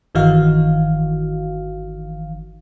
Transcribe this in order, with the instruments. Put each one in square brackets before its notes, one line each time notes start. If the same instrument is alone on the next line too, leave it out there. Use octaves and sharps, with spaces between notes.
[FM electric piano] G1 D#3 E3 D#4 F#4 F5